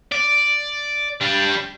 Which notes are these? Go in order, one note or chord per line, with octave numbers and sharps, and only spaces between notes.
D5
G3 D4